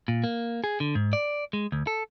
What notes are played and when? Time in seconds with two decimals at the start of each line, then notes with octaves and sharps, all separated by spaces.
0.08 A#2
0.24 A#3
0.64 G#4
0.80 D3
0.95 G#2
1.13 D5
1.53 G#3
1.72 D2
1.87 A4